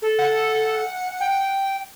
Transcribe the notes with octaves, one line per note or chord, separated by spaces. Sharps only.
A4
F#5
G5